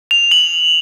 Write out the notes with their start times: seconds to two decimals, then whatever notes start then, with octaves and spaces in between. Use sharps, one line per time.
0.11 F7
0.31 F#7